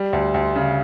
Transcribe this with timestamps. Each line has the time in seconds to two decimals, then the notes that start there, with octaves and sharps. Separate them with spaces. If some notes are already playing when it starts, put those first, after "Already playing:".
Already playing: G3
0.13 D2
0.34 D2
0.55 C#3